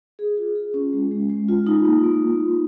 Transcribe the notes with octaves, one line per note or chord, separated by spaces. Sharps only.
G#4
F4
G#4
C#4
G#3
G#3
G#3
F4
D#4
A#3
A#3
A#3
A#3